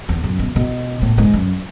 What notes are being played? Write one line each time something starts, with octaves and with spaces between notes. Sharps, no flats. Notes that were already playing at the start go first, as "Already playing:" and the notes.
E2
F#2
B2
B2
A2
G#2
F#2